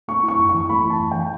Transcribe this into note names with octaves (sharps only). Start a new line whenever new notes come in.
A3 C#6
E4 C#6
F#2
C#6
E3
A3 B5
E4 A5
F#2
E3 G5